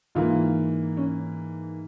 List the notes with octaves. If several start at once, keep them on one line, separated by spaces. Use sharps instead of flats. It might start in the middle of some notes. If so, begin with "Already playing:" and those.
G#2 E3 A#3 F4
C#4